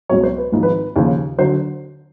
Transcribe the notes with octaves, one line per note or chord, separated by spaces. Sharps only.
C#2 B2 F#3 C#5
C5
B4
G#1 G#2 F3
B4
D#2 C#3 F3
D3 F#3 C5